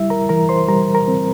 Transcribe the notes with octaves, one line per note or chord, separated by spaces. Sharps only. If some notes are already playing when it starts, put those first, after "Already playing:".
Already playing: G3 E4 E5
A#4 A#5
E3 A#4 A#5
C5 C6
G3 A#4 A#5
A#4 A#5
C4